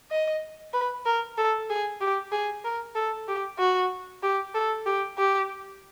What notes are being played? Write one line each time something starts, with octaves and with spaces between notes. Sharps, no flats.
D#5
B4
A#4
A4
G#4
G4
G#4
A#4
A4
G4
F#4
G4
A4
G4
G4